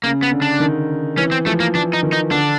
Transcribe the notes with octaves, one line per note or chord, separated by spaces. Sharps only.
C#3 A#3
B3
D3
D4
D#3
E3 C#4
C4
F3 A3
A#3
E3 D4
D#4
D#3
D#4
D3 D4